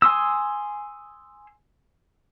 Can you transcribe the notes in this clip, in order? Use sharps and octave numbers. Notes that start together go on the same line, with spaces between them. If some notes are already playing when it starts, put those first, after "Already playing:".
G#5 C6 D#6 E6